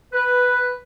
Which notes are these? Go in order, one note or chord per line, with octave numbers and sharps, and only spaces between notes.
B4